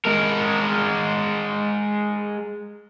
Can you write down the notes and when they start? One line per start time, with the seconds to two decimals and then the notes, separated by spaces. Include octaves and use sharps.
0.05 G#3 A#4